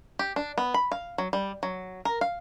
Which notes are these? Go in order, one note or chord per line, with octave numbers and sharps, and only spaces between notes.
G4
D4
B3
B5
F5
F#3
G3
F#3
A#4
F5